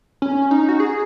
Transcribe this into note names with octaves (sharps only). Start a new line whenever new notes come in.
C#4
D#4
F#4
G#4